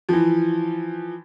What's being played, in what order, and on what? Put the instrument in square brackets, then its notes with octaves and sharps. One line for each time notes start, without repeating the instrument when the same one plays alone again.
[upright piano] E3 F3